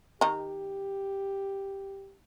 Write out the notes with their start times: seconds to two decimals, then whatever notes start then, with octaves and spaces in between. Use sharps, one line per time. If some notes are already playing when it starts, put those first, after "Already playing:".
0.21 D#3 D#4 G4